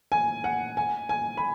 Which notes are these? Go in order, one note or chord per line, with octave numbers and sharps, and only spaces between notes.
G#5
F#5
G#5
G#5
B5